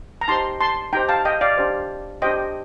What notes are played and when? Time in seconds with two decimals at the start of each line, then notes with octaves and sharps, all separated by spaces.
0.21 A#5
0.28 D#4 G4 C5 A5 C6
0.61 A5 C6
0.93 D#4 G4 C5 G5 A#5
1.09 F5 A5
1.25 D#5 G5
1.41 D5 F5
1.57 D4 G4 C5
2.22 D4 G4 C5 D#5 G5